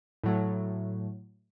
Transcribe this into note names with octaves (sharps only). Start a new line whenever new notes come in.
A2 F#3 A3